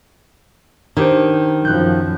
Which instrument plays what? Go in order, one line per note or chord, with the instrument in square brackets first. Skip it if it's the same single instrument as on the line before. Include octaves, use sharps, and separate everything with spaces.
[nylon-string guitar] D#3 [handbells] D4 G4 C5
[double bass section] F#2 F3 [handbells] F#6 G6